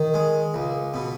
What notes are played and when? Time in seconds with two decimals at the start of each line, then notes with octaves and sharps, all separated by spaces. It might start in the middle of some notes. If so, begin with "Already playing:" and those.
Already playing: D#3
0.14 G#3
0.54 C#2
0.94 B2